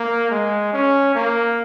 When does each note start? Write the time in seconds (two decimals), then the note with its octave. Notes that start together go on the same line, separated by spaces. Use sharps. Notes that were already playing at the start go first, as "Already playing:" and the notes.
Already playing: A#3
0.31 G#3
0.73 C#4
1.15 A#3